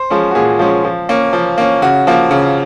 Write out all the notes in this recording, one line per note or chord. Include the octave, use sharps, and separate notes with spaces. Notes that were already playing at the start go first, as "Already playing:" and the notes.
Already playing: C5
F3 G#3 C#4
F#4
A#2 G#4
F3 G#3 C#4
F3
A#3 C#4
F3
A#3 C#4
C#3 F#4
F3 A#3
C#3